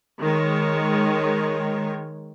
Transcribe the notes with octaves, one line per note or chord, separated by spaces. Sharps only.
D#3 G#3 C#5